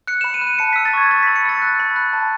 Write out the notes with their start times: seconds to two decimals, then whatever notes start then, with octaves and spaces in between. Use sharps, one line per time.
0.07 F#6 C#7
0.21 B5 E7
0.34 D#7
0.41 F#6
0.47 D#7
0.59 A5 C#7
0.73 E6 B6
0.85 A6
0.93 C#6 G#6
1.11 E6 A6
1.23 B5 B6
1.36 C#7
1.45 E6 A6
1.62 F#6
1.80 B5
1.96 F#6
2.13 A5